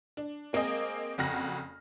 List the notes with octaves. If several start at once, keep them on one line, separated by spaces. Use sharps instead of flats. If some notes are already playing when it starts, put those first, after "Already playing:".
D4
G#3 A#3 C4 G#4 D#5
F#1 F2 F#4 F6 A#6